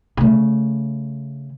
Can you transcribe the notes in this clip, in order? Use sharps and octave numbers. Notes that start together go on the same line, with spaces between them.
C#3 A3